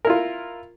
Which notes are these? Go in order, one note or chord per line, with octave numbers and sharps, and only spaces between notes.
E4 F4 A#4